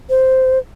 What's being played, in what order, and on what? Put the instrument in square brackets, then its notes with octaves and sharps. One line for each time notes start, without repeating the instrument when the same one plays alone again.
[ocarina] C5